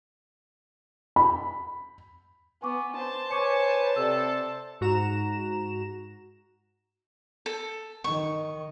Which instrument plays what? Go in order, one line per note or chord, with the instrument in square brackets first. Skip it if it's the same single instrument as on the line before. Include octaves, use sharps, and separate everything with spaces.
[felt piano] B5
[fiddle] B3 [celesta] G#5 C#6 D6
[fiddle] C5 A5
[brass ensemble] B4 C#5 G#5 [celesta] C#6 D6 C#7
[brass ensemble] C3 A4 [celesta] D5 E6
[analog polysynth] G#2 F#4 A#5 E7
[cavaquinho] A4
[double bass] D#3 [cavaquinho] C#6